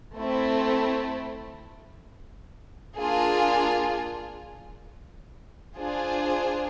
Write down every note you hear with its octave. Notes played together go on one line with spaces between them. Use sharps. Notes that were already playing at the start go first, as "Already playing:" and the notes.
A3 C4 E4
A#3 D4 F4 G#4
D4 F4 G#4 C5